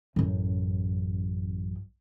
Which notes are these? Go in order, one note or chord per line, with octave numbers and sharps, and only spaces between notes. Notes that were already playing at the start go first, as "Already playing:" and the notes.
A1 F#2